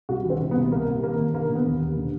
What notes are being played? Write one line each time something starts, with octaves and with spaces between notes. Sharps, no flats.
C2 F#4
D#3
C4
C2
B3
C2
C3 A#3
C2
D#3 A#3
D#3
D3 A#3
D3
B3
D#2
D#2
D3